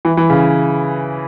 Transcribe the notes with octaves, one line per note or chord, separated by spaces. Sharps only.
E3
E3
C#3